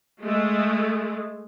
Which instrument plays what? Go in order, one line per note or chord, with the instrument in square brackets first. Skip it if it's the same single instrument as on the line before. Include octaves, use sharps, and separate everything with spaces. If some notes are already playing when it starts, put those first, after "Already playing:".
[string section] G#3 A3